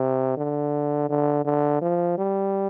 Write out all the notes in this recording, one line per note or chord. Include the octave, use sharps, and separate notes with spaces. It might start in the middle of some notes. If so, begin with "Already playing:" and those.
Already playing: C3
D3
D3
D3
F3
G3